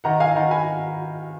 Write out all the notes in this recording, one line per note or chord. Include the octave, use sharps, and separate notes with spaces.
D#3 F#5 A#5
F5 G#5
D#3 F#5 A#5
G#5 B5